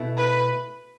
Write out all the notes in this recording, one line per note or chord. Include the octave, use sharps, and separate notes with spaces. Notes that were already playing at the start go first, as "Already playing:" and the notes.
Already playing: B2 A3 E4
B4